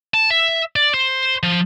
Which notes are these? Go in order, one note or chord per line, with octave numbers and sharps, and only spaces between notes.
A5
E5
D5
C5
F3